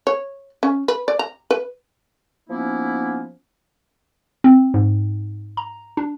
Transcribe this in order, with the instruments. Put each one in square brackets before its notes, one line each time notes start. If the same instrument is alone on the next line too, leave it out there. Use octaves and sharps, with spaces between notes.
[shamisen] C#5
C#4
B4
D5
A#5
B4
[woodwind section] F3 A#3 B3 C#4 D#4 E4
[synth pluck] C4
G#2
A#5
D4